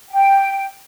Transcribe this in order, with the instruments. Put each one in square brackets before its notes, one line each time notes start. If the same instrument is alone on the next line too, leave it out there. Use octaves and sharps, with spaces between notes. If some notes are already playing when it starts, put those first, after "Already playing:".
[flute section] G5